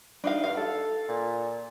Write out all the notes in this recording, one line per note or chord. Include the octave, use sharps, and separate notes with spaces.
D4 D#4 F5
G2 F5
A4
A#2